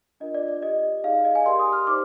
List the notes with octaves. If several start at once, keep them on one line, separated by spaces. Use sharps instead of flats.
D4 F4 A#4 D#5
D5
D5
G4 D5 D#5
D#4 G#4 D5 F5
D#5
G#5
G4 A#4 D5 C6
D#6
F6
D#4 G4 C5 D6